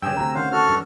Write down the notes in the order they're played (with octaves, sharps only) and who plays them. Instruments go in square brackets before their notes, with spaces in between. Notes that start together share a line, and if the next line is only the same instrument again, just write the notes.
[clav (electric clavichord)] G2 C#3 [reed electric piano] G5 G#5 D#6 [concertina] E6
[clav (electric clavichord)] D2 C3 [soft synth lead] A#5
[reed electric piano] D#3 C#4 [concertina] C5 F5 [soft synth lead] F#5
[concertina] F#4 A4 F6
[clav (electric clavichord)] G2